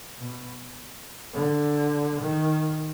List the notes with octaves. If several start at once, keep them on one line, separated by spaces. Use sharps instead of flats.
B2
D3
D#3